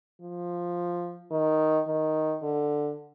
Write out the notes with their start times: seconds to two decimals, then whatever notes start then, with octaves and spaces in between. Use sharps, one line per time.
0.21 F3
1.31 D#3
1.87 D#3
2.43 D3